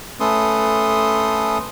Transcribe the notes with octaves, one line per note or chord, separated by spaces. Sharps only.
A3 C#4 A4 B4 C6 D#6